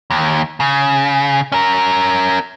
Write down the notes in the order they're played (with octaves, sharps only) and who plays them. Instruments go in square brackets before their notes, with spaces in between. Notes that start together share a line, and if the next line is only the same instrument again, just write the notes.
[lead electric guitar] D#2
C#3
C#4 A#4